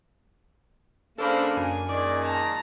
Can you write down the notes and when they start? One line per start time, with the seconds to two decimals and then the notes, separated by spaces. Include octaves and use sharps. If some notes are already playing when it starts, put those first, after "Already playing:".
1.18 C#3 A#3 D4 A4 A#4 C5 B5
1.57 F#2 G#5
1.88 A#2 D#3 G#3 D5
2.23 A5 A#5